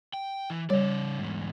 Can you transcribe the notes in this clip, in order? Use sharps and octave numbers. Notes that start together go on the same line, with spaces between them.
G5
E3
C#3 G3 C#5 D5
E2 G#2